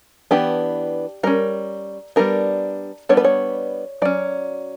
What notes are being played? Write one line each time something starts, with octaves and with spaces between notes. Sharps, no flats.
E3 B3 D4 G4
G3 C#4 A#4
G3 B3 D4 A#4
G3 B3 D4 C#5
B4
C#5
F#3 C#4 D5